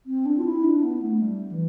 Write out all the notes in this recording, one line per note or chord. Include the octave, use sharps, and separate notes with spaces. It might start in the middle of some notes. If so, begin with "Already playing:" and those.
C4
D4
F4
E4
D4
B3
A3
G3
E3